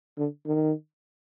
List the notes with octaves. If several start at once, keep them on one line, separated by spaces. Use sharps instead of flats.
D3
D#3